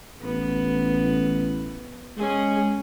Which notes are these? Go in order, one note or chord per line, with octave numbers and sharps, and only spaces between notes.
A1 B3
G#3 C#4 G#4